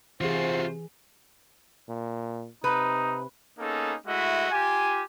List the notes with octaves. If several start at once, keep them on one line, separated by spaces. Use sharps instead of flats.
C3 E3 F4 F#4 G#4 C5
A#2
C3 D#4 B4
A#3 B3 C#4 D#4 G#4 A4
G#3 A3 E4 F#4 D#5 E5
F4 G4 G#5